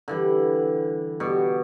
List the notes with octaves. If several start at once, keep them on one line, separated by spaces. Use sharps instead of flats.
D3 E3 G3
B2 G3